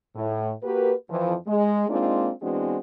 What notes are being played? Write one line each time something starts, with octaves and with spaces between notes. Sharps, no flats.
A2
A#3 F#4 G4 A#4 B4
F2 E3 F3
G#3
G#3 A#3 C4 D4 D#4 F4
E3 G#3 B3 C4 D4 F#4